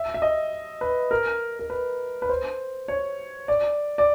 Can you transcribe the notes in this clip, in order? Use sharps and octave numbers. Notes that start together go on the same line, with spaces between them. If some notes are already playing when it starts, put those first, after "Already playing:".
Already playing: E5
E5
D#5
B4
A#4
A#4
B4
B4
C5
C#5
D5
D5